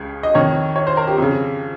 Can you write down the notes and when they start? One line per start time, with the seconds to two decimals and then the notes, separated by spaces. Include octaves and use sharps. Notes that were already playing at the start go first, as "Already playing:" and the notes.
Already playing: C#2 C#3
0.23 D#5
0.34 F2 D#3 C#5
0.76 C#5
0.87 C5
0.97 A#4
1.07 G4
1.18 F2 C#3